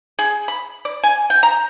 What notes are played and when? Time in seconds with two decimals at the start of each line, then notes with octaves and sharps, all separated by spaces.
0.19 G#4
0.48 B5
0.85 D5
1.03 G#5
1.30 G5
1.43 A#5